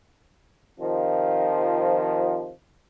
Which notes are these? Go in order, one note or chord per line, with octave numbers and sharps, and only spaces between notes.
C3 D#3 F3